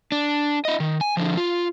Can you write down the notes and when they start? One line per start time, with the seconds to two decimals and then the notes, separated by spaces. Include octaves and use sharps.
0.12 D4
0.65 E4 D#5
0.80 D#3
1.01 G#5
1.17 D3 F3
1.37 F4